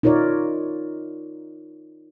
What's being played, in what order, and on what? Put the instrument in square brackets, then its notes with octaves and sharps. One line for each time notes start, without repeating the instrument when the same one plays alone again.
[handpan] D#4 F4 A#4 C#5 D5